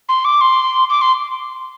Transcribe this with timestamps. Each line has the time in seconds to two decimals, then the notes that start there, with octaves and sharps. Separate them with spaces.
0.09 C6
0.25 D6
0.41 C6
0.89 D6
1.01 C6